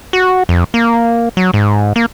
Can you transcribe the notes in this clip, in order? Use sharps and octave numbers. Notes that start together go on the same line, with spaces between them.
F#4
F2
A#3
F#3
G#2
A#3